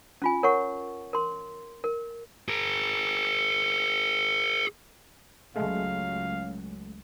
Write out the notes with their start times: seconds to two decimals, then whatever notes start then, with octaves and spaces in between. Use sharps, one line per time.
0.22 C#4 F4 G#5
0.43 A#4 C#5 F#5 C#6
1.13 A#4 C6
1.84 A#4
2.48 G#4 A#4
5.56 C#2 F#3 G#3 A3 C#4 F5